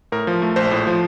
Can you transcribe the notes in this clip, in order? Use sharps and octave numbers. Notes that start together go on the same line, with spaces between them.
A2 A#4
F3
A3
A#1 C5
A2
F3